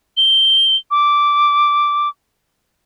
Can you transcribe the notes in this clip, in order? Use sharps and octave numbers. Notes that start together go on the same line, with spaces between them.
G7
D6